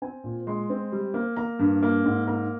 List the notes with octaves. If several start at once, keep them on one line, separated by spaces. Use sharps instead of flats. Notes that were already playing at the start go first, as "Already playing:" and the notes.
C4 G#5
A#2
G#3 C6
C4
G3
A#3
A#3 A#5
G2
A#3
G#2
A#3 A#5